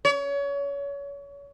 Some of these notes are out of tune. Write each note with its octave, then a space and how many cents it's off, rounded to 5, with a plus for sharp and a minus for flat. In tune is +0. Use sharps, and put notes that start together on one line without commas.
C#5 +30